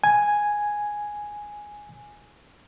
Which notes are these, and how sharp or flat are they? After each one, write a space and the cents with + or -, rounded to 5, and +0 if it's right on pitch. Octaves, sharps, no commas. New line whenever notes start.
G#5 +0